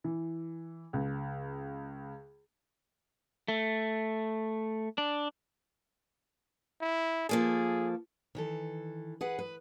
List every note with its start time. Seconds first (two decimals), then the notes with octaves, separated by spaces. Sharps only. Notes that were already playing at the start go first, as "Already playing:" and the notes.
0.04 E3
0.93 C#2
3.48 A3
4.98 D4
6.81 E4
7.29 F3 A#3 G#4 A4
8.35 D#3 E3 A4
9.21 G#4 B4 F#5
9.39 B4